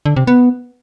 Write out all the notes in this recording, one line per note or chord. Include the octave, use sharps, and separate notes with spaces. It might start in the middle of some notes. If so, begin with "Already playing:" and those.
D3
C3
B3